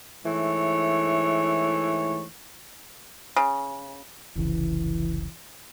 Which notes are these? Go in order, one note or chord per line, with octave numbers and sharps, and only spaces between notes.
G#2 E3 A3 C#5
C#3
F1 C2 C#3 E3